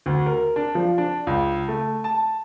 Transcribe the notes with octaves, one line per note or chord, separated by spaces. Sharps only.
D2
A#4
D4
F3
D4
C#2
A3
A5